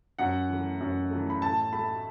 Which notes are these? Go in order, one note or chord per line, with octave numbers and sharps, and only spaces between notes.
F#2 F#5
E3 A3
F#2
E3 A3
B5
A2 A5
A3 B5